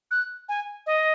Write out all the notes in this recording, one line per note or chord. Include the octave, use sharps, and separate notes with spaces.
F#6
G#5
D#5